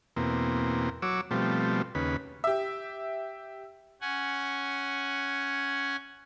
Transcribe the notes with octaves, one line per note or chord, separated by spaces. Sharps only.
E2 B2 A#3 C4
F#3 C#5 D6 E6
B2 F3 G3 A3 C4
D#2 C#3 B4
G4 E5
C#4 F#5 G#5